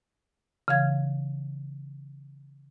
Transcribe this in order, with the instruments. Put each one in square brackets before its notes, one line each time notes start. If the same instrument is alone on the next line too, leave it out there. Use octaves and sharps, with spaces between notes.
[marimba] C#3 E3 F5 G#6